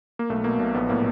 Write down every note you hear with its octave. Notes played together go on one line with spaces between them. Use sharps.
A#3
B1 A3
B2 A#3
B1
A#1 B3
A2 A#3